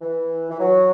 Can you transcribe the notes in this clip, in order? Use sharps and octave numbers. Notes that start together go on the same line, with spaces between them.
E3
E3
F#3